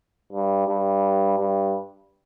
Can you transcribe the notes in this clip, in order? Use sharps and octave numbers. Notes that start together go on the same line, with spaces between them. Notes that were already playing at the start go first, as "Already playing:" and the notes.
G2
G2
G2